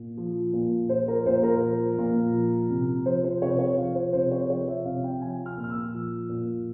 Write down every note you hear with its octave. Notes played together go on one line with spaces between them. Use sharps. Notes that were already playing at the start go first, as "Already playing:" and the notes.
Already playing: A#2
F3
A#2
F3 C5
A#4
A#2 C5
A#4
F3
A#2
F3
C3
F3 C5
C5
C3 C#5
C#5
F3 F5
C5
C3 C5
C#5
F3 C#5
E5
C3 F5
G5
F3 G#5
F6
A#2
F6
E6
F3
A#2